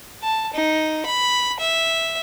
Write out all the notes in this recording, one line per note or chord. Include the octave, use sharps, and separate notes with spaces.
A5
D#4
B5
E5